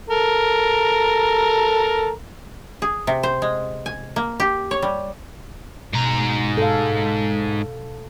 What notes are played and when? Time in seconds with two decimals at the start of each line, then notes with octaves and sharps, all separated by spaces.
0.10 A4 A#4 A#5
2.82 G#4
3.07 C3
3.23 C5
3.42 G#3
3.86 G#5
4.16 A#3
4.40 G4
4.71 C#5
4.82 G3
5.93 G#2 B2 A#5
6.57 A4 F5